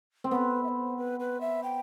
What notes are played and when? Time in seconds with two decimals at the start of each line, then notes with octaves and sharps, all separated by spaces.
0.24 C4
0.31 B3 C5
0.35 B4
0.64 E5
0.68 C5
0.97 B4
1.20 B4
1.41 E5
1.63 G5